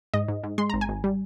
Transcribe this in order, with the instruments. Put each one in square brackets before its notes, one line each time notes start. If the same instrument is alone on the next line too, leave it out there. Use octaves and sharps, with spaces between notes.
[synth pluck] G#2 D#5
G#2
G#2
G#3 C6
G#1 A#5
G#5
G#1
G3